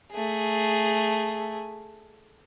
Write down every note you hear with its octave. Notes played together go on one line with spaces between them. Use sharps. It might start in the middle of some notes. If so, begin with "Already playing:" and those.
A3 G#4